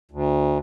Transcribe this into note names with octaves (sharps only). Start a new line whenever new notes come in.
D2